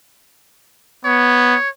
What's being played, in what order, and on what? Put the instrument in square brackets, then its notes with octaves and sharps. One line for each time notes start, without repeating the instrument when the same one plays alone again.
[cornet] B3 [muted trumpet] C#5